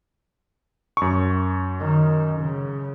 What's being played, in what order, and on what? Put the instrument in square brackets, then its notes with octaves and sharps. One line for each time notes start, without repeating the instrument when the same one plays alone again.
[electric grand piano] F#2 C#6
[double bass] D#3
C#3